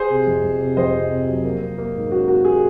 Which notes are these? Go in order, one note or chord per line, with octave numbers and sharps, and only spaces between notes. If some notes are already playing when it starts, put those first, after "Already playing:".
Already playing: G#4 C5
C3
F2
F2
C3
F2 C5 D#5
C3
C3
F#3
A#3
A#3
A#3
G#2
C#4 F#4
A#3 F#4
A#3 G#4